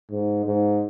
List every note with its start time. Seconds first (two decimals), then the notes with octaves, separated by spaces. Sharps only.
0.11 G#2
0.45 G#2